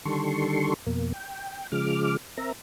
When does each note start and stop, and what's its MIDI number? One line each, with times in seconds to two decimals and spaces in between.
0.05 0.74 50
0.05 0.74 51
0.05 0.74 55
0.05 0.74 69
0.05 0.74 84
0.05 0.74 85
0.86 1.12 41
0.86 1.12 47
0.86 1.12 58
1.13 1.67 79
1.72 2.17 49
1.72 2.17 53
1.72 2.17 56
1.72 2.17 86
1.72 2.17 89
2.37 2.52 60
2.37 2.52 70
2.37 2.52 76
2.37 2.52 82